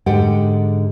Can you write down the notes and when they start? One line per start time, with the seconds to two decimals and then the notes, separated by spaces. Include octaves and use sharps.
0.06 G#2 D3 G4 F#5